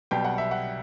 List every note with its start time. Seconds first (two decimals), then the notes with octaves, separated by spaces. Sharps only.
0.11 B1 B2 G3 G5
0.24 F#5
0.38 E5
0.51 F#5